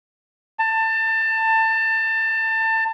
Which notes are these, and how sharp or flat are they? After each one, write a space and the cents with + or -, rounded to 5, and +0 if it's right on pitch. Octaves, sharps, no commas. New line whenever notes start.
A5 +25